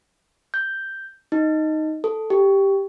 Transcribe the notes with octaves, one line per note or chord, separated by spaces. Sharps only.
G6
D#4
A4
G4